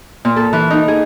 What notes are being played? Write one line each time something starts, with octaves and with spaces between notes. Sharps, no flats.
A#2
A4
E3
D#4
G#4